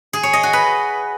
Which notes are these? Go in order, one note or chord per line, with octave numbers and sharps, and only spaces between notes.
G#4
C#5
D#5
F#4
B4